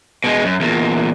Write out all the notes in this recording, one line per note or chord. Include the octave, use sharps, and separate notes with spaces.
B2 G#3
F#2
E2 A#2